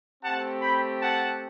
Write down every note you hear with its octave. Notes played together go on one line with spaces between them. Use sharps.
A3 C4 G4 F#5 A5
G5 B5
F#5 A5